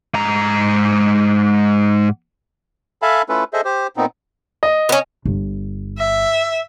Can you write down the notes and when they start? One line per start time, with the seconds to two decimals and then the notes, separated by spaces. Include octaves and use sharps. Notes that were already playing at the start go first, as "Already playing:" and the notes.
0.14 G#2 A#5
3.02 A4 E5 F5 G#5 A5 B5
3.29 A3 C#4 E4 F4 A4 B4
3.53 G#4 A4 C5 D#5 E5
3.65 G4 C5
3.97 A#2 B3 C4 D#4
4.63 D#5
4.89 B3 C#4
5.25 G1
5.98 E5